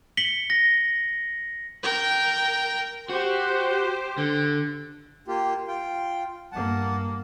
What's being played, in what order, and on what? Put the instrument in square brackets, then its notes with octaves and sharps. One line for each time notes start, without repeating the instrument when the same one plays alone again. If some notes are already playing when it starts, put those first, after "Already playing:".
[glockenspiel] B6 C#7 F#7 G7
A#6
[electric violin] A#4 G5
[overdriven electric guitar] F#4 [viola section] G4 C5
[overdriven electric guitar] D3
[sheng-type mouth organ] A#3 F4 G4
F4 G5
[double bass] G2 A#3 [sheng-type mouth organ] F#5 A5